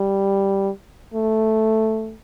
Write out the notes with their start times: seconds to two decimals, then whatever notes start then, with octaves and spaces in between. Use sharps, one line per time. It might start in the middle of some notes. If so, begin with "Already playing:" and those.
Already playing: G3
1.14 A3